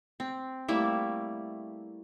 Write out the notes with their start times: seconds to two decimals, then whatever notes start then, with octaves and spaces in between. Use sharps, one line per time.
0.20 C4
0.68 G3 A3 A#3 E4